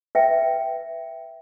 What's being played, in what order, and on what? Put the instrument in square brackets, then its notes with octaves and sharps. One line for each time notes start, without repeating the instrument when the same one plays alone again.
[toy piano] B4 E5 G5